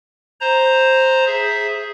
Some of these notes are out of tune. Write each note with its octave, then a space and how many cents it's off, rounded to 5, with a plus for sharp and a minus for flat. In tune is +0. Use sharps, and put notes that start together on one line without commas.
C5 +5 A#5 +0
G#4 +5 E5 +0